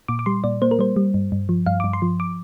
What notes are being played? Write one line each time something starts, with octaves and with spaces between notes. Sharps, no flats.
A#2 D6
D6
G3 C6
A#2 D5
A#3 C5
A#4
G3 C5
G3
G2
G2
F3
G2 F5
G2 D6
C6
F3
D6